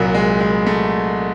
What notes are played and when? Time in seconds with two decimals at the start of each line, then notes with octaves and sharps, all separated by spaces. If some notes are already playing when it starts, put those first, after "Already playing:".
Already playing: C2 A#2 F#3
0.14 G#3
0.40 G#3
0.66 A3